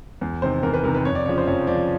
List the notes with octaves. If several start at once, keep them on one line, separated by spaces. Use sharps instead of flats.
E2
C3 D#3 C5
E2 A#4
B4
C3 D#3 A#4
B4
F2 C#5
D5
C#3 F3 C#5
C5
F2 C#5
C#3 F3 D5